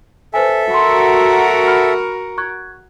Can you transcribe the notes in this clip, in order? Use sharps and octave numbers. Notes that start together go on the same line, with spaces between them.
A4 B4 C5 E5 G#5
F#4 A#4 B5 C6
B5 F6
C#6 F#6 G#6